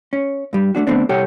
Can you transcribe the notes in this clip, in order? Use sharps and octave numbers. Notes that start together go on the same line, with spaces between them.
C#4
G2 G3
A3 A#3 D4 F#4
D3 D#3 A3 B3 C4 D4
C2 G4 A4 C#5 F#5 G5